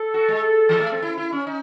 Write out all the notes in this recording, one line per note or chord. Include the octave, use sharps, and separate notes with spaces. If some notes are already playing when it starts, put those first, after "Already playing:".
Already playing: A4
F#4
G#3
E3
A3
C4
E4
E4
C#4
D#4